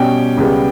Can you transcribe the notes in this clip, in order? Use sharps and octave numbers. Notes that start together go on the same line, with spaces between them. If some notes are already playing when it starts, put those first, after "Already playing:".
Already playing: B2 G3 C#4 G5
C#2 C#3 G3 B3